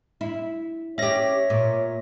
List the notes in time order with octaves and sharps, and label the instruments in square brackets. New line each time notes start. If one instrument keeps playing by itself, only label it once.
[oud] E4
[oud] C#4 G4 [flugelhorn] C#5 [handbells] E5 A#6
[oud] A#2